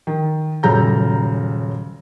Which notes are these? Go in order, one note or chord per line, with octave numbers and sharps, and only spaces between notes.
D#3
D#1 F#2 C#3 A4 A#5 G6